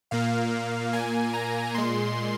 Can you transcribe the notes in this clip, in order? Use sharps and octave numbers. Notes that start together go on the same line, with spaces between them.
A#2 A#3 F5
A#2 A#3 G#5
A#5
A#2 G#3 C6